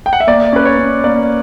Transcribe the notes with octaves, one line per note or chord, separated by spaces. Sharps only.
G5
F#5
E5
A#3 D5
C#4 B4
C#5
C#4
A#3 D5